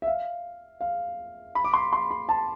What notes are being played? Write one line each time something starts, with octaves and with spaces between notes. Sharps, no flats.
E5
F5
F5
B5
D6
C6
C6
B5
A5